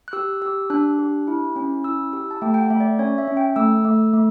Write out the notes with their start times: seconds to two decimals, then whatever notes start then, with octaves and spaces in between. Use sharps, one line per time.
0.08 F#6
0.13 G4 E6
0.42 G4 E6
0.70 D4 F#6
0.99 G4
1.28 E4
1.56 C#4
1.84 E4 E6
2.13 G4 E6
2.31 A5
2.42 A3 G5
2.54 G5
2.61 F#5
2.70 A3 E5
2.80 D5
2.99 C#4 C#5
3.18 E5
3.27 C#4
3.37 G5
3.56 A3 E6
3.85 A3
4.13 A3